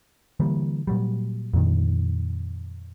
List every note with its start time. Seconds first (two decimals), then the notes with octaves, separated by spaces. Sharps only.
0.40 D3 E3 G3 A#3
0.87 A#2 F#3 G3
1.54 F2 A#2 D#3